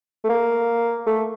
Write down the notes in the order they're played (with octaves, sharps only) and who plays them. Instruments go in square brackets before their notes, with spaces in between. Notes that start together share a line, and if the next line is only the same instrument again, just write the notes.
[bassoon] A3
A#3
A3